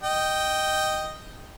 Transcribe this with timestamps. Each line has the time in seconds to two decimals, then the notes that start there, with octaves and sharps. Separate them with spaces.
0.03 D#5 G5